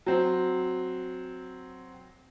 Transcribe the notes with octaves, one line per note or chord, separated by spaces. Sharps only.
F#3 C4